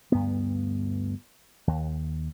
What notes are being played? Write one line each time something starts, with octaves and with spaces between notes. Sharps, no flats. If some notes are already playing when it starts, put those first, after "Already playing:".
D2 G2 B3
D#2